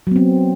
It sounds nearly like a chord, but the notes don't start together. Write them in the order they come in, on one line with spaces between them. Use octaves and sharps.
F#3 B3 C4